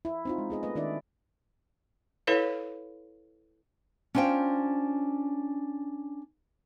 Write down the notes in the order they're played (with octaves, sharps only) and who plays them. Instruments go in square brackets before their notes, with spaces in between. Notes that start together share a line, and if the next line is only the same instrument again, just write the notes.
[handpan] E4
C4 D#4 F4
G#3
B3 G#4 D#5
A3 B3 B4 D#5
D#3 D4 E4 D5 E5
[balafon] E4 A4 B4 C#5 F5
[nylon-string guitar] C#4 D4 F4 C5 G5